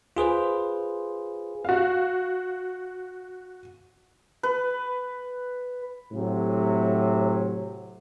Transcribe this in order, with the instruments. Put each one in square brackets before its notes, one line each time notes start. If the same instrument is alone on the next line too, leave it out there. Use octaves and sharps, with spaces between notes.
[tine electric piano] F4 G#4 B4 C5
[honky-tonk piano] F#4 F5
[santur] B4
[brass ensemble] A2 C3 F#3